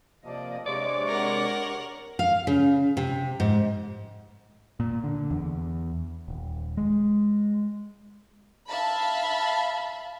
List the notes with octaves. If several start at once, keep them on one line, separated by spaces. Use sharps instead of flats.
C3 F3 A#3 D5 D#5
C3 G#3 D4 C#5 D5 D6
A#4 F#5
F5
C#3
C3
G#2
A#2
D3
E2
D#1
G#3
E5 F5 A5 B5